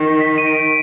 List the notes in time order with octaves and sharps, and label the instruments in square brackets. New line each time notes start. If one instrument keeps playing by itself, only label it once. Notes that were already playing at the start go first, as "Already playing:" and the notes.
Already playing: [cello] D#3
[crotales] B6
D#7
D7
D7